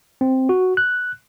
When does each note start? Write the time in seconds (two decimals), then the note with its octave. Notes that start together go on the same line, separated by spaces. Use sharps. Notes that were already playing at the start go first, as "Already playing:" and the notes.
0.21 C4
0.49 F#4
0.77 F#6